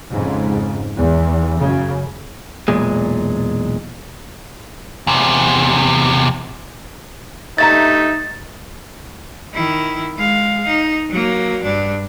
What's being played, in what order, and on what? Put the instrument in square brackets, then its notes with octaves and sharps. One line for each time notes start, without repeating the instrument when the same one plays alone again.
[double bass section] F2 G#2 C#3
E2
F#2 C#3
[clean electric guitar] B1 E2 A#2 G#3
[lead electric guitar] E2 C3
[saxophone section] G2 A3 E5 [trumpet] D#4 [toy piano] D5 F5 A#5 [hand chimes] A6
[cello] D#3 E4
G#3 F5
D#4
F#3 A#3
G2 D4